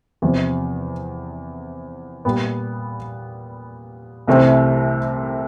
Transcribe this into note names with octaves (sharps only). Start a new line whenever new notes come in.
E2 C3 F3
A#2 G3 B3
C2 C3 E3 A3 C4